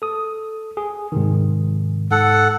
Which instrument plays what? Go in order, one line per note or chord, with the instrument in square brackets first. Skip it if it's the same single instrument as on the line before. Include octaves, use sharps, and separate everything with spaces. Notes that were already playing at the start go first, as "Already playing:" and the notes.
[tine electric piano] A4 D#6
G#4
G#2 C3 D#3
[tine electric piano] G#2 [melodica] A4 F#5